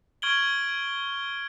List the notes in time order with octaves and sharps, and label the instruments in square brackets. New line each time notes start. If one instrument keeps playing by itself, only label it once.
[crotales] C#6 F6 G#6 D7 F#7 G7